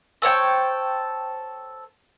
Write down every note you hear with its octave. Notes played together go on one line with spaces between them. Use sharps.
A4 C5 C#5 G5